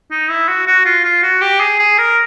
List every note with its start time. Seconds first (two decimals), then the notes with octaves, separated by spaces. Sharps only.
0.11 D#4
0.30 E4
0.48 F#4
0.67 F#4
0.85 F4
1.04 F4
1.23 F#4
1.41 G4
1.61 G#4
1.79 G#4
1.98 A#4